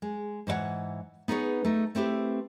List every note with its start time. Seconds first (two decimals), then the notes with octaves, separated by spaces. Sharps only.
0.02 G#3
0.47 G#2 E3 C5 C#5 F#5
1.28 B3 D#4 G#4 B4 C#5
1.65 A3 D#4
1.95 A3 C4 E4 G4 B4